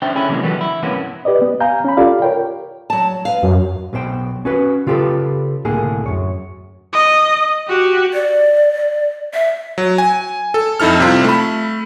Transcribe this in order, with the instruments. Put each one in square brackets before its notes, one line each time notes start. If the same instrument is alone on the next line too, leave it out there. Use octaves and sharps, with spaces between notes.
[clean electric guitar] C#4 D4 C5 E5 G5
D3 C#4 E4 G#4
C3 E3 F#3 G#3 A#3
D3 E3 F#3 G3 B3
E4
G2 C3 E3 A#3 B3 C#4
[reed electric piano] G4 B4 D5 D#5
B3
F5 G#5 A#5 G6
C#4 B5
F4 G4 A4 D5 F5
A#4 C#5 G5
[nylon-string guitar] F#3 A5
B4 F5
[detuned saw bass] F#2
[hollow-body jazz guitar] B1 B2 C5 G5
C#4 F#4 B4
C#3 F4 G4 A4 B4
C2 A2 D3 A#3 G#4
F#2 C#5
[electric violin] D#5
F#4 G4
[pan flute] D5
E5
[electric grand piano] F#3
G#5
A4
F2 D#4 E4 A4 F6
C3 G3 C4 F4
A3 B5